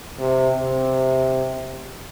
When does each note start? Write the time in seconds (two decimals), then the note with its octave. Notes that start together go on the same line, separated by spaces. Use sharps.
0.20 C3
0.60 C3